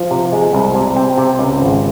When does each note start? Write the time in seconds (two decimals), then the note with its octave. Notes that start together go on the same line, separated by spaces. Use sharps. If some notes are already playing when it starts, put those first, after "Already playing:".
Already playing: F3
0.11 C3
0.32 G#3
0.53 C2
0.75 C3
0.96 C4
1.18 C3
1.39 C#2
1.60 G#1